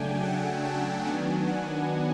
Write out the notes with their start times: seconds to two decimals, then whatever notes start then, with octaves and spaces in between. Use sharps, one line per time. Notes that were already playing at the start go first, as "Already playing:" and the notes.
Already playing: C#3 F#3 A3 D4 G5 G#5
0.24 F#5
0.65 A5
1.06 D#3 F#3 B3 D4 G#5
1.48 F#5